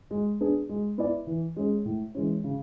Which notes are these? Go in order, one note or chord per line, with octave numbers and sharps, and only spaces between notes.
G#3
B3 D4 G#4 B4
G#3
B3 E4 B4 D5
E3
G#3 C#4 G#4
A2
E3 G#3 C#4
C#3